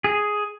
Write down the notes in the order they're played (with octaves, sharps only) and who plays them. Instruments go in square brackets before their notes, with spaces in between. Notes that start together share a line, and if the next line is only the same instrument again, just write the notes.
[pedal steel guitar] G#4